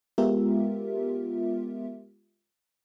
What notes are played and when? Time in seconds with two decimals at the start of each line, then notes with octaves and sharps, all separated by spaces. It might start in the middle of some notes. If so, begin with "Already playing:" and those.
0.18 G#3 B3 F4 G4 A#4 E5